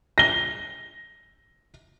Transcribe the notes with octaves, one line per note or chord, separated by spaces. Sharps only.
A#6 G7